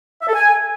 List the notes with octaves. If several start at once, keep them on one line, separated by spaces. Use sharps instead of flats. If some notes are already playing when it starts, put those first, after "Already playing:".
E5
A4
G#5